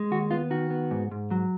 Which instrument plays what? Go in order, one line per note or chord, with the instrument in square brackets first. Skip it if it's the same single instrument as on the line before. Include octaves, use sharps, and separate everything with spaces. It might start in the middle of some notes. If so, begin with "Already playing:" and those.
Already playing: [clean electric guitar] G#3
D#2 F#4
B3 F4
D#3 F#4
B3
G#2
G#2
F#3